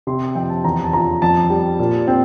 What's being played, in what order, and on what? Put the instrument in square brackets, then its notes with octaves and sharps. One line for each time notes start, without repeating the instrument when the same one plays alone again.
[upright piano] C3 C6
F2 G5
A5
E2 A#5
A5
F3 A#5
F2 A5
G3
A#2
C4